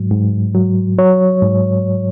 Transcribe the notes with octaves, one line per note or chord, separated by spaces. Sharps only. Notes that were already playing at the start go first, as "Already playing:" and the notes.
Already playing: G#2 F#3
G#2
F#3
F#3 C#5
G#2